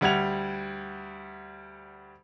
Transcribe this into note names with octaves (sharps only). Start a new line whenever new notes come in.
D2 G3 F#5 G#6 F7